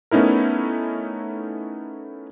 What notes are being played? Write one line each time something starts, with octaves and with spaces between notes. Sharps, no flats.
A3 B3 C#4 D#4 E4 A#4